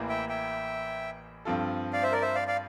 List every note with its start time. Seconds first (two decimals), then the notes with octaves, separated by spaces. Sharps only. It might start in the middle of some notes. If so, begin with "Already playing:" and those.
Already playing: A1 A2 E3 A#3
0.09 E5 G5
0.29 E5 G5
1.45 G2 F3 C4 F4 A4
1.93 D5 F5
2.03 C5 E5
2.12 A#4 D5
2.22 C5 E5
2.35 D5 F5
2.47 D5 F5